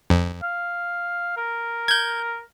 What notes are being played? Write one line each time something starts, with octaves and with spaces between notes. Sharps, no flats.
F2
F5
A#4
G6 G#6